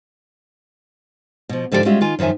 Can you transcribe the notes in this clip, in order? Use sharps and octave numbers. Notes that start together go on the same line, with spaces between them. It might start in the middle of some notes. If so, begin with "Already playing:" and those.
B2 F3
G#2 D3 F3 G4 A4 D5
G3 G#3 C#4 F4 F#4 E5
D#3 F4 G#5
F#2 D#3 F3 E5 G#5